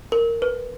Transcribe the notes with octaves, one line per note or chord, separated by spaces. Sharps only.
A#4
B4